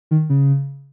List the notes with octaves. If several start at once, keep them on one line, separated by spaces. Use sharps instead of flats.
D#3
C#3